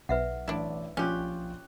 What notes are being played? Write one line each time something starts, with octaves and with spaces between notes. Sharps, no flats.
B1 B4 E5 F#5
A1 D4 E4 D5
A#1 C#4 F4 G4 F#6